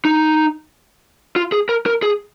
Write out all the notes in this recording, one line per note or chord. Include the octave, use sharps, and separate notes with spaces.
D#4
F4
G#4
A#4
A#4
G#4